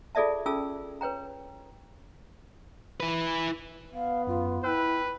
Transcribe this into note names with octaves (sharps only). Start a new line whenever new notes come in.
F4 G#4 A4 D5 E5 A5
C#4 F4 G#4 A4 A5 E6
B4 C#5 G5 A#5
E4 B4
B3 F5
F#2 F4
E4 B4 G5 E6 F#6